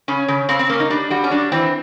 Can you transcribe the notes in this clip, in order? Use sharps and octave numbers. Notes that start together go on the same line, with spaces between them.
C#3 C#4
C#3
C#3 C4
C4
A#3 C#4
D#4
G3 D4
G3 F#4
C#4
G3 D4
E3 C4